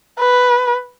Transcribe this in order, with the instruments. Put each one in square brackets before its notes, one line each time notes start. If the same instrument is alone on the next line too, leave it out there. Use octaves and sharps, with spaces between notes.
[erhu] B4